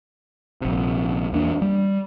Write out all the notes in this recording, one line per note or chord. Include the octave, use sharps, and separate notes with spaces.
A#1 C3
E2 A#3 D4
G3